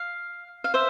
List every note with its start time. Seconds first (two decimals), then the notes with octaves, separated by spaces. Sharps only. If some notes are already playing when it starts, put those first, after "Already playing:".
Already playing: F5
0.64 F5
0.74 C5 E5